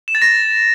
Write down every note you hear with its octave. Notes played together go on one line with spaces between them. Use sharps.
E7
A6
A#6